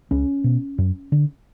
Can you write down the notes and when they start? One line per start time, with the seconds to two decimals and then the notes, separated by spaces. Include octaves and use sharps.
0.11 C#2 C#4
0.44 B2
0.78 F#2
1.12 D3